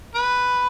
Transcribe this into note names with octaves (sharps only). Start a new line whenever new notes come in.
B4